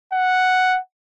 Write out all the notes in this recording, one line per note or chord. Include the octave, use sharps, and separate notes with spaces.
F#5